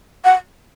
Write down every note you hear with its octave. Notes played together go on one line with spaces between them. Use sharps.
F#5